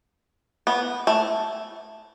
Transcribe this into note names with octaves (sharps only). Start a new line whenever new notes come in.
B3
A3